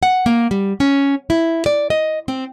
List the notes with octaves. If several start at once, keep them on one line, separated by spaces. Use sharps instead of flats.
F#5
A#3
G3
C#4
E4
D5
D#5
C4